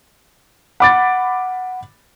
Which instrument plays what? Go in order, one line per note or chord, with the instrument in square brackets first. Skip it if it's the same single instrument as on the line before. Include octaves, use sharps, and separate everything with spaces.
[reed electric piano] F#5 [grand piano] B5 D6 A6